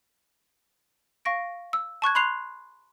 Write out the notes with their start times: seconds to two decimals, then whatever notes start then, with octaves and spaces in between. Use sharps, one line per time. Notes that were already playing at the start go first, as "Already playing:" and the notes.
1.25 F5 C#6 A#6 D7
1.73 E6
2.02 A5 C#6 F#6 G#6
2.15 B5 C6 F#6 C7 F7